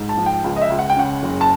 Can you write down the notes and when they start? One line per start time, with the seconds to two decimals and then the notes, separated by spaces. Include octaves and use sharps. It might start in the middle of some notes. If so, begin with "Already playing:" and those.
Already playing: G#2
0.09 A5
0.17 F3
0.26 G5
0.44 C#2
0.56 D#5
0.62 E5
0.70 C#2
0.79 F#5
0.90 G5
0.97 C#3 F#5
1.23 F#1
1.41 A5